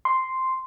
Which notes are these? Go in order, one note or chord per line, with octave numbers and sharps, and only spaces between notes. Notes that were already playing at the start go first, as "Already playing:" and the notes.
C6